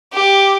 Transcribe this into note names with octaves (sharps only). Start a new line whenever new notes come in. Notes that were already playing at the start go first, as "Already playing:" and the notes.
G4